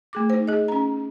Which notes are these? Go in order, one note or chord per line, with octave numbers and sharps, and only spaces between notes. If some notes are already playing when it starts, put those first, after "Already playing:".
A3 G#4 D6
D#4 C5
G#4 D#5
C#4 A#5